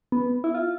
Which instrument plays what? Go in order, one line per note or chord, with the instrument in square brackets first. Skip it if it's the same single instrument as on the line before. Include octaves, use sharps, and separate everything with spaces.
[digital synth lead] B3
E4
F4